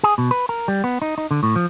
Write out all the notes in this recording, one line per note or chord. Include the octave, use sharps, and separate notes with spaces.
G#4
B2
B4
A#4
G3
B3
D#4
D#4
D3
A2
F3